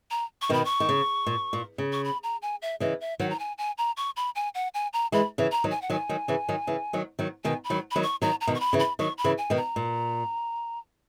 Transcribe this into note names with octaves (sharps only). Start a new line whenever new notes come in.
A#5
C#6
B2 D#3 B5
C#6
D#3
C#3
A#2
A#2
C#3
C#6
B5
A#5
G#5
E5
C#3 E3 D#5
E5
D#3 F#3 F#5
A#5
G#5
G#5
A#5
C#6
B5
G#5
F#5
G#5
A#5
E3 G#3 B5
C#3 E3
A#5
D#3 F#3
G#5
F#5
D#3 F#3 G#5
D#3 F#3
C#3 E3
D#3 F#3
C#3 E3
D#3 F#3
D#3 F#3
B2 D#3 G#5
B5
D#3 F#3
D#3 F#3 B5
C#6
D#3 F#3 A#5
A#5
B2 D#3
C#6
B5
C#3 E3
B5
D#3 F#3 C#6
B5
C#3 E3
G#5
B2 D#3
A#5
A#2